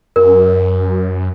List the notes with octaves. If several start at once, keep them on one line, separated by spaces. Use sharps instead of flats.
F#2 A#4